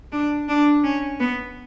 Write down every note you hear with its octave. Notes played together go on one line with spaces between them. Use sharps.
D4
D4
C#4
B3